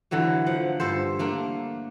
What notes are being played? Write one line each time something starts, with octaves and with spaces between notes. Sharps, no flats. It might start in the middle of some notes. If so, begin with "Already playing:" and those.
D3 E3 F#3 A3
F3 F#5
G2 A4 C5
A3 A#3 D4